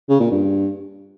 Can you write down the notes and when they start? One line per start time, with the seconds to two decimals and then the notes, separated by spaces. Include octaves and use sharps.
0.09 C#3
0.20 A#2
0.31 G2